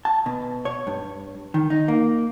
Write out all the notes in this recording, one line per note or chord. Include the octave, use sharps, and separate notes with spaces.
A5
B2
C#5
G2
D#3
D#4
A#3